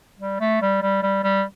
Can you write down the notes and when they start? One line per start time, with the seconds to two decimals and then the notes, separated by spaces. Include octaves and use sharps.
0.19 G3
0.40 A3
0.62 G3
0.82 G3
1.03 G3
1.24 G3